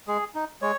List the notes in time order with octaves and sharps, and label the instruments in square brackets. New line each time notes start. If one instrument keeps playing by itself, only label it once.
[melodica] G#3 G#4
D#4
G#3 C#5